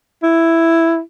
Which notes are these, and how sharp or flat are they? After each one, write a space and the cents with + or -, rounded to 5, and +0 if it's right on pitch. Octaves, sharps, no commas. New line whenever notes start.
E4 +5